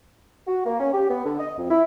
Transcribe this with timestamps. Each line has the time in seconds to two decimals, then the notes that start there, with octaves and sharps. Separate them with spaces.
0.47 F#4
0.66 A#3
0.80 C#4
0.93 G4
1.09 B3
1.26 D3
1.39 D#5
1.58 F2
1.70 E4